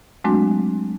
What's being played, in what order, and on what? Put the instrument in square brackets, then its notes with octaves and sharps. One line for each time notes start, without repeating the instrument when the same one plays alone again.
[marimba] F#3 G#3 A3 C4 D4 F#4